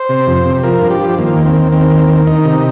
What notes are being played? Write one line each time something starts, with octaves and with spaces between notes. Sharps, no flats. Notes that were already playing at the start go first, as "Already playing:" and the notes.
Already playing: C5
C3
F2
C3
F3 A#4
G2
G4
F3
D#3 A#3
D#2
C4
D#2
D#3 C4
D#2
D#3
D#3 D#4
C3